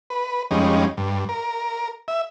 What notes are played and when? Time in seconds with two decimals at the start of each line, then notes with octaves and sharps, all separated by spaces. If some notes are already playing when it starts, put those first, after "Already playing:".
0.10 B4
0.51 F2 G3 G#3 C#4 D#4
0.97 G2
1.29 A#4
2.08 E5